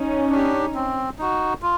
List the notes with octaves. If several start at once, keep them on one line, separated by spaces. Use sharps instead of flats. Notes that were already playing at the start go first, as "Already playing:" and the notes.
Already playing: C#4 D#4
D4 G4
C4
D#4 F#4
F4